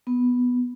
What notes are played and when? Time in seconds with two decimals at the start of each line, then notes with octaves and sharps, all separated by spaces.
0.07 B3